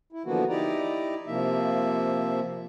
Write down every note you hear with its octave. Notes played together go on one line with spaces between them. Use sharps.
E4
D3 E3 F3 A#3 B3 F#4
D#4 E4 G4 D5 A#5
C3 F3 A#3 E5